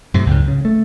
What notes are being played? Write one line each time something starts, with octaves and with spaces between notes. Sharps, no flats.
F#2 A2 C3
C#2 G#2
C#3
A3